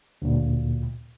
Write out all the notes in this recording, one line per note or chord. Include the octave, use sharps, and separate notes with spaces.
D2 A#2